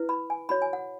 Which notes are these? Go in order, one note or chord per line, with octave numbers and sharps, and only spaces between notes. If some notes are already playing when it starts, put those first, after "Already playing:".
Already playing: E4 B4
B5
G#5
F#4 C#5 B5
G#5
F#5